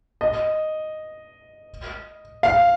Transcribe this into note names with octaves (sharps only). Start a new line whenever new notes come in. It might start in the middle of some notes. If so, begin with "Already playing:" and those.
D#5
F5